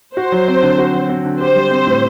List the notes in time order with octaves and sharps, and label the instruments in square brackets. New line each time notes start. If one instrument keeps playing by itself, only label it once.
[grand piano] F#4 [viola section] C5
[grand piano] F#3
C4
D3
F#4
F#3
C4
D3
[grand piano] G4 [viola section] C5
[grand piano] G3
C4
A2